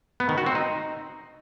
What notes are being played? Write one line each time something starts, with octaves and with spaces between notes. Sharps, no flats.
B3
D#3
F#4
C4
D#4